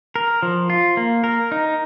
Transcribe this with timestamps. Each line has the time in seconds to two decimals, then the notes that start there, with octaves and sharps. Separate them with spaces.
0.16 A#4
0.43 F3
0.70 F4
0.97 A#3
1.24 A#4
1.52 D#4